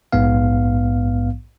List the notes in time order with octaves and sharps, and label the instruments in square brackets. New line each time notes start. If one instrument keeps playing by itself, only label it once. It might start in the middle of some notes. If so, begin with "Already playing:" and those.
[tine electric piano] A#1 G#2 B3 F5